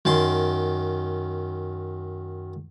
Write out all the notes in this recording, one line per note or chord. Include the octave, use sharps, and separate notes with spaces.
F#2 D#3 A5 C6